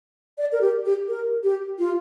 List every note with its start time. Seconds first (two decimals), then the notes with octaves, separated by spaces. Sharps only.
0.38 D5
0.52 A#4
0.61 G4
0.85 G4
1.08 A#4
1.44 G4
1.79 F4